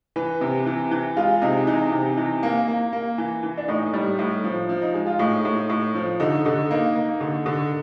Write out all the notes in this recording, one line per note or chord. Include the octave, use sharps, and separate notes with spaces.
E3 B4
C3
E3
E3
G#3 F4
C3 D#4
E3 D#4
C3
E3
A#3
A#3
A#3
E3
E3
D4
A2 D#4
G3
A2
F3
F3
D#4
G#3
F4
A2 D#4
A2
A2
F3
D3 D#4
D3 D#4
A#3 D#4
A#3
D3
D3